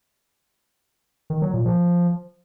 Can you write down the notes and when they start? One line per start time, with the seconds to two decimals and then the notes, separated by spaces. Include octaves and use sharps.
1.30 D#3
1.42 F#3
1.54 A#2
1.65 F3